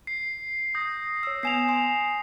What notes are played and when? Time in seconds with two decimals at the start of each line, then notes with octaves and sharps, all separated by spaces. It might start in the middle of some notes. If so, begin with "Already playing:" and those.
0.07 C7
0.75 D#6 G6 A#6
1.23 C#5 E6
1.43 B3 G#5 C7 E7 F7
1.69 G#5 C6